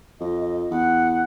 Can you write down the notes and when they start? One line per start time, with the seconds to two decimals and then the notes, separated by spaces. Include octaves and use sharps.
0.20 F2 D#5
0.41 D#5
0.70 E2 F#5